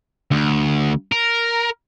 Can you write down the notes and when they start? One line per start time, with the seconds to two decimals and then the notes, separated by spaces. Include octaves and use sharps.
0.31 D2
1.12 A#4